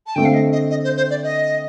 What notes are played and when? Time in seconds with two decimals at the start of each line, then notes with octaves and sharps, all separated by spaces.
0.07 A5
0.16 D3 A3 C4 G5
0.25 F5
0.34 D#5
0.52 D#5
0.70 D#5
0.84 C5
0.97 C5
1.11 D5
1.24 D#5